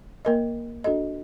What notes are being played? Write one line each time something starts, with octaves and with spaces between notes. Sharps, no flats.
A#3 A#4 D#5
D4 F#4 A4 D#5